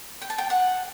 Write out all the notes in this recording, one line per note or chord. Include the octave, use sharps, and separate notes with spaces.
G5
A5
G5
F#5